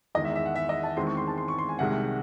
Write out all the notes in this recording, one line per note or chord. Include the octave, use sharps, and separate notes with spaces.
E2 D#3 G#3 D#5
E5
E5
F#5
E5
D#5
A5
E2 D#3 G#3 C4 C6
C#6
C6
A5
C6
C#6
C6
G#5
C2 C3 D#3 G#3 F#5